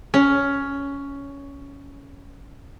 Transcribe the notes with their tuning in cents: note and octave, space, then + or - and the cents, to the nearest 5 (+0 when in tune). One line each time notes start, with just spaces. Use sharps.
C#4 +10